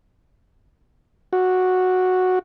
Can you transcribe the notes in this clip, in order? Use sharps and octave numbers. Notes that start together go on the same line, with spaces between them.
F#4